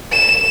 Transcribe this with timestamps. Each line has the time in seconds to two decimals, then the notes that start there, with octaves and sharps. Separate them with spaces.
0.12 E7